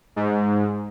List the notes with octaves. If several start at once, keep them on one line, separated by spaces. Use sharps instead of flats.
G#2